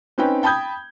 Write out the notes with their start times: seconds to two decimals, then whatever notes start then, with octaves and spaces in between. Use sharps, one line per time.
0.18 C4 C#4 D#4 B4 G5
0.43 G5 A5 B5 D#6 G6 G#6